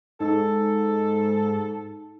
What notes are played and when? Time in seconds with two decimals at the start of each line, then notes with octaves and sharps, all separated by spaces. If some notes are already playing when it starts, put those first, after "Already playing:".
0.20 G#2 D#4 A4